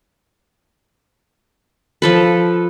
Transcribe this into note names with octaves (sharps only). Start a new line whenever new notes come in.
F3 A4 B4